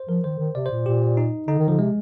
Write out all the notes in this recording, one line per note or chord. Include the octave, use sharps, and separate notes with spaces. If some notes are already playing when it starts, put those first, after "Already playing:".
Already playing: C5
F3 A#4
D#3 C5
D#3
C3 D5
C5
A#2
A#2 G4
D#4
D3 D#4
D#3
D3 F3
C3 G#3